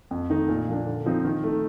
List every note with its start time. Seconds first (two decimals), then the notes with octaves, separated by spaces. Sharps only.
0.11 F2
0.30 D#3 A3 D#4
0.49 A#2
0.68 F3 A#3 D4
0.87 D3
1.06 F3 C4 D#4
1.25 D#3
1.44 A3 D#4